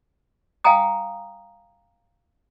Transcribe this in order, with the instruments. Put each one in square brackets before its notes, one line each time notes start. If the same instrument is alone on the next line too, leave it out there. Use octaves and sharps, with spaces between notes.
[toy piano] F5 G5 G#5 A#5 D#6